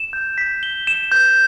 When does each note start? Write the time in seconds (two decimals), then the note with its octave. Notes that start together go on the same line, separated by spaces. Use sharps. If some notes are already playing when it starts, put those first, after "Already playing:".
Already playing: E7
0.13 G6
0.38 B6
0.63 G7
0.87 E7
1.12 G6